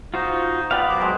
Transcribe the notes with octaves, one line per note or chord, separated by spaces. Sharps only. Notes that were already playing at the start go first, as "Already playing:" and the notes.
D#4 F4 F#4 C5
B3 G4 D5 F5
F#3 A#4 C5 D6
G#3